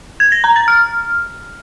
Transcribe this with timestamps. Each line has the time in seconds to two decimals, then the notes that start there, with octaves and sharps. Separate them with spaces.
0.20 G#6
0.32 A#6
0.44 A#5
0.56 A6
0.68 F6